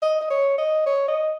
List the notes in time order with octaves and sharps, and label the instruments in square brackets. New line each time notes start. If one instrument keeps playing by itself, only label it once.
[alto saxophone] D#5
D#5
C#5
D#5
C#5
D#5